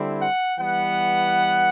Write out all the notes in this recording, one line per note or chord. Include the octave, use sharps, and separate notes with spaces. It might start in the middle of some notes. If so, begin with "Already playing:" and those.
Already playing: D3 G3 C4 E4
F#5
E3 G3 B3 F#5